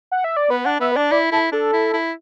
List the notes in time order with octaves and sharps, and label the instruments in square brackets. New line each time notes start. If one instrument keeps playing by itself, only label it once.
[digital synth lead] F#5
E5
D5
[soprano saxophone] B3 [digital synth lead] B4
[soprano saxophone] D4 [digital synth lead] F#5
[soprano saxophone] B3 [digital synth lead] E5
[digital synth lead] B4
[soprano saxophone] D4 [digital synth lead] D5
[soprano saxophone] E4 [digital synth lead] D5
[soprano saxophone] E4 [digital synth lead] A4
[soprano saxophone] D4 [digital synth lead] A4
[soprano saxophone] E4
E4